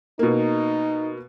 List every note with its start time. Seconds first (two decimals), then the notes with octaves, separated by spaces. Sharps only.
0.19 B2 A#3 D#4